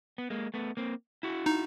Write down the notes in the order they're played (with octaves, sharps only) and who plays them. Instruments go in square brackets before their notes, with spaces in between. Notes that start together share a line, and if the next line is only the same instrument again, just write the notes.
[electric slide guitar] B3
G#3 A#3
A3 B3
A#3 C4
E4 F#4
[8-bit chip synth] D#4